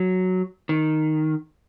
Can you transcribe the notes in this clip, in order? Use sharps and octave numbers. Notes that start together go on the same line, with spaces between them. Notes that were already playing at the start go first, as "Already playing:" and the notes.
Already playing: F#3
D#3